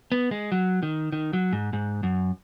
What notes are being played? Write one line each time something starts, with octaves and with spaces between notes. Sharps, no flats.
B3
G#3
F#3
D#3
D#3
F#3
G#2
G#2
F#2